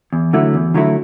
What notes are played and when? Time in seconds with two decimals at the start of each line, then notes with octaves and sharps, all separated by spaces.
0.13 E2
0.33 D3 F#3 A3 E4
0.54 E2
0.74 D3 F#3 A3 E4